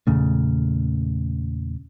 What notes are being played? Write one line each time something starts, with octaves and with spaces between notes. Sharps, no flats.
E2 A#2 C#3 A3